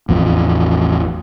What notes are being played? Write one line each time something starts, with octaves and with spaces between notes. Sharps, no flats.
A1 E2 F3